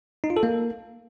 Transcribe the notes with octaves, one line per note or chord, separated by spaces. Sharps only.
D#4
F4
A4
A#3